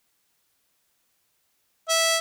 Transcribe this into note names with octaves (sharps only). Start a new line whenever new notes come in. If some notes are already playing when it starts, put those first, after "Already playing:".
E5